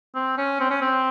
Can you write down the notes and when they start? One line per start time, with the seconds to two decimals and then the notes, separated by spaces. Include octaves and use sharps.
0.15 C4
0.37 C#4
0.60 C4
0.70 C#4
0.81 C4